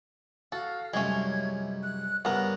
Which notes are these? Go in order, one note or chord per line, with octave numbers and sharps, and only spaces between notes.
F#4 A4 F5
C2 F#2 G#3 A3 C#4 G#6
F#6
G2 C#3 B3 A#4 F#6